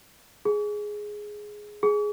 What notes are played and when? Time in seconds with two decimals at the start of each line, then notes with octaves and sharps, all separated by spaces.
0.45 G#4
1.83 G#4